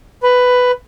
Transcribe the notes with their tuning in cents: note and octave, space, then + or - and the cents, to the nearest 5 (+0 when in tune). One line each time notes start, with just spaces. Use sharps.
B4 +10